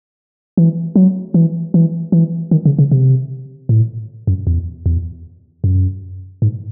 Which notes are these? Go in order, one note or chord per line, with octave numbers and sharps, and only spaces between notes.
E3
F#3
E3
E3
E3
D#3
C#3
C#3
C3
A2
F#2
E2
E2
F#2
G#2